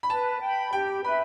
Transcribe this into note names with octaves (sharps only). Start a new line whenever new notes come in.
B5
B4 A5
G5 B5
G4 G5
B4 E5 B5